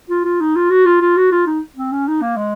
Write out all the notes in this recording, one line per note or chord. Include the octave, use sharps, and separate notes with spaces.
F4
F4
D#4
F4
F#4
F4
F4
F#4
F4
D#4
C4
C#4
D#4
A#3
G#3